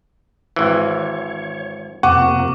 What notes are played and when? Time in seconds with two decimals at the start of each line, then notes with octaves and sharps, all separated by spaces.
0.56 G#1 E3 C#5
2.03 F2 C3 A#3 F#5 C#6 D6